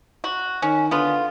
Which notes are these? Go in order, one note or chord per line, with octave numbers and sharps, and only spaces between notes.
F#4
D#3 C#4
D3 B3 F4